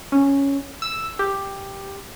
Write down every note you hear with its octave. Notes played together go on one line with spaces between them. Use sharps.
C#4
E6
G4